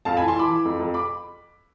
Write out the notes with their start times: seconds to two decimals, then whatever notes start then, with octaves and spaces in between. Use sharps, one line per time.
0.05 F2 F5 A5
0.17 G#5 B5
0.21 E3
0.28 A5 C6
0.36 E3 B5 D6
0.50 E3
0.65 F2
0.79 F2
0.94 B5 D6